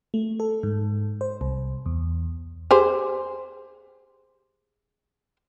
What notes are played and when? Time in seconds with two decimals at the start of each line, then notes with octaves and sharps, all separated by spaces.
0.14 A3
0.40 A4
0.63 G#2
1.21 C5
1.41 C2
1.86 E2
2.71 G4 G#4 C5